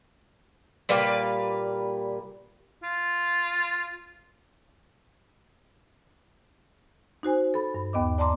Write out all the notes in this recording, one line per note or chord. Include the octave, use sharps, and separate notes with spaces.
A#2 G3 B4 F5
F4
D#4 F#4 C5 G#5
A4 B5
G2
D#2 B3 D#5 D6
D5 A5 A#5 C6 D6